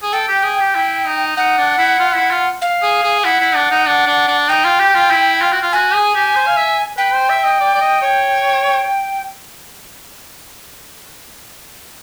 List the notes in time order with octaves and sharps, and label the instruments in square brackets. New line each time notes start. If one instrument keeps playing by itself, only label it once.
[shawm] G#4
[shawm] A4 [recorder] G5
[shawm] G4
G#4
G4
E4
D#4
[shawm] D#4 [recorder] F#5
[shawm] D4
E4
F4
E4
F4
[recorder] F5
[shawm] G#4
G#4
[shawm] E4 [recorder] F#5
[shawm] E4
D4
D#4
D4
D4
D4
[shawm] D#4 [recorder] G5
[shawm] F4
G4
F4
E4
F4
F#4
F4
[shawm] F#4 [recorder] G#5
[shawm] G#4
G4
C5
F5
E5
[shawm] B4 [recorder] G5
[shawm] C5
E5
D#5
D5
D5
D#5
C#5